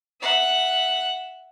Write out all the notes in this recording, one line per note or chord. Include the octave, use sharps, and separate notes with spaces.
E5 F#5